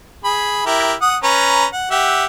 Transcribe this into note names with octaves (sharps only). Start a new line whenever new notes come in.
G#4 B5
E4 G4 A#4
F#5 D#6
C#4 B4 A#5
F#5
G4 E5 F#5